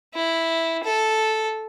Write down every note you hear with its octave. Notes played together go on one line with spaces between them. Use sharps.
E4
A4